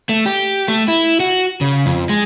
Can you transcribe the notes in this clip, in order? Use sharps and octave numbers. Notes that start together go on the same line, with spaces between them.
A3
G4
A3
E4
F#4
C#3
F2
G#3